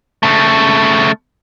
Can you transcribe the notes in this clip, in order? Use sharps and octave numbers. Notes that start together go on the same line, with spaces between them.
C#3 A3